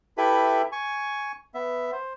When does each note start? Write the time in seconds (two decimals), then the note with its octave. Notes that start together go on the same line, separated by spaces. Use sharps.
0.18 E4 G4 A4 B4 E5 B5
0.72 G#5 C#6
1.54 B3 E5
1.92 C5